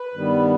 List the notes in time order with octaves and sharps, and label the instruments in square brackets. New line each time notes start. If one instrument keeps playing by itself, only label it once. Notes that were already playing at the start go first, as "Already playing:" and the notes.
Already playing: [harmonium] B4
G2 D#3 G3 B3